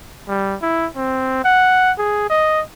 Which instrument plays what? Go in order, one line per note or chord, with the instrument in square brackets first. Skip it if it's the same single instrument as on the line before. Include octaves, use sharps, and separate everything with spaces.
[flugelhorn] G3
E4
C4
F#5
G#4
D#5